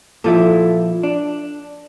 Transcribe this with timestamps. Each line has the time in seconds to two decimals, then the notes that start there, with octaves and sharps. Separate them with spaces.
0.24 A#2 F3 E4 A4
1.03 D4